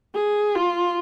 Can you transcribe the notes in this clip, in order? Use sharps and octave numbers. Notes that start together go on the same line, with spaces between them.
G#4
F4